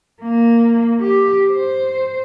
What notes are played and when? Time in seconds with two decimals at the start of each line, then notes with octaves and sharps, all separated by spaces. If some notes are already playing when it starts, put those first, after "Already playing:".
0.23 A#3
1.00 G4
1.51 C5